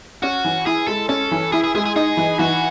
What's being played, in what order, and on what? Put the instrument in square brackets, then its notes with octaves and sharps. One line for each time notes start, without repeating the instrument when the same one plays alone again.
[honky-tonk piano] C#4 [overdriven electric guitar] F#4
[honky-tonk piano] E3
[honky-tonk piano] E4 [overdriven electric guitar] G#4
[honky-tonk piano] G#3 [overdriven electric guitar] A4
[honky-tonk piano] C#4 [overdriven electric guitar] A4
[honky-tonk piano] E3
[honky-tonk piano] E4 [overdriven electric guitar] G#4
[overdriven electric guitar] G#4
[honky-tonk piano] G#3 [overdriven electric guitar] G#4
[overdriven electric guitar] G#4
[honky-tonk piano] D#4 [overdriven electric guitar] G#4
[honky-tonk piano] E3
[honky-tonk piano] E3 [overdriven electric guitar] F#4